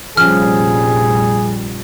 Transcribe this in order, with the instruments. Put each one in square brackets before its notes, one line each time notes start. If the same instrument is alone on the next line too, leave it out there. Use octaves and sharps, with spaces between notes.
[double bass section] F1 A#1 G3 [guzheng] F3 C#4 [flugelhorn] G#4 [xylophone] F6